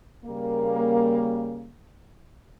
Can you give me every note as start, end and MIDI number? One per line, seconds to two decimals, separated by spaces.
0.24 1.71 49
0.24 1.71 55
0.24 1.71 58